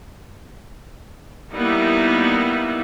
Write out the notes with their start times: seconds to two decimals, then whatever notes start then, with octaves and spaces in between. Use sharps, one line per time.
1.54 G3 A#3 B3 D#4 E4